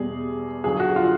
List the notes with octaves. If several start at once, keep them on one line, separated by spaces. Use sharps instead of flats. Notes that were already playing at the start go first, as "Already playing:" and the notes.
Already playing: E2 B2 G3 G#4
G2 D3 F#3 G#4
F#4
F4